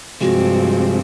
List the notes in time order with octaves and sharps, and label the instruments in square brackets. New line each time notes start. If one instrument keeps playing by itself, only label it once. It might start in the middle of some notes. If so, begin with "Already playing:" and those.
[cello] G2 C4 [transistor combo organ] C3 F3 G#3 [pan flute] F#4